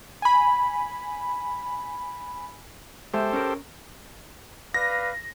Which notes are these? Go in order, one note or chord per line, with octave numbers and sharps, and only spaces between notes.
G#5 B5
G#3 G4 A4 C5 E5
C#4 A#4
B4 D5 F5 A#6